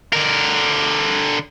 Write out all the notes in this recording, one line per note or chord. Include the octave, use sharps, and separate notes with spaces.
D3 A#4